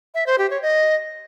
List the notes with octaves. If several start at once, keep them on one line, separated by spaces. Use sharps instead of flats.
E5
C5
G4
C#5
D#5